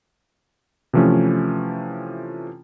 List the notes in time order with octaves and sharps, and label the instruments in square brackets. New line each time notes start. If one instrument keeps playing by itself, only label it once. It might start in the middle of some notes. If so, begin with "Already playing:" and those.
[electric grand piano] C3 E3 F3 A3 C#4